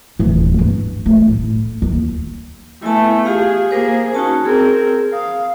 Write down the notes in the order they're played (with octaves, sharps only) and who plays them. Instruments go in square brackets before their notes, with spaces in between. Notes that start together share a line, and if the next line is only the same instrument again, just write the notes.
[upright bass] D1 E3
G2 D#4
A3
A2
D#2
[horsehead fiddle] A3 B3 [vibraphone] E4 G#5 A5
[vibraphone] F4 G4 F5 [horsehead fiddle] G#4
[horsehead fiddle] A#3 G#4 [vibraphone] A#4 C5
[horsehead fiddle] C#4 [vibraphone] D#4 F#4 A5
[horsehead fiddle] C4 A#4 [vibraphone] G#4
[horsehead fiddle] F5 [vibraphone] D#6